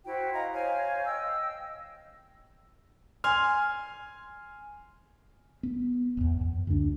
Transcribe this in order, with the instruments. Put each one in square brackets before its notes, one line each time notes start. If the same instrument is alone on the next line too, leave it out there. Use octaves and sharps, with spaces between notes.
[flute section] E4 F#4 C5 G5
D#5 F5 A#5
C5 C#5 F5 G#5
D#5 G5 E6
[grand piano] G#5 C6 F6
[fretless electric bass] B3
E1 E2
F#2
D2 D4